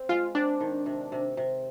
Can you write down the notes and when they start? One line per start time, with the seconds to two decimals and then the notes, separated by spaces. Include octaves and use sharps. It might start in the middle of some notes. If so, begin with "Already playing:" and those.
Already playing: C4
0.09 G#3 F4
0.35 C4 D4
0.60 D#3
0.86 C3
1.12 C3
1.37 C3